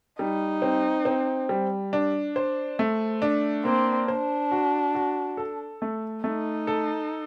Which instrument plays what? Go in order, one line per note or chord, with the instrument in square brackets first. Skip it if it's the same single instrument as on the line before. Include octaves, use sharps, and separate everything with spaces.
[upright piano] G3 [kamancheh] D#4
[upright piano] C4
C4
G3
D4
C5
A3
D4
[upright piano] A#3 [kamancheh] C4
[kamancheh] D4 [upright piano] C5
[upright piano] F#4
F#4
A4
A3
[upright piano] A3 [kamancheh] D#4
[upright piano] A4